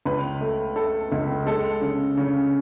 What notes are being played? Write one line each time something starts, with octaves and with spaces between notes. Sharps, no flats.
C#2 B4
A3
A3 A4
C#2
G#3 A4
C#3
C#3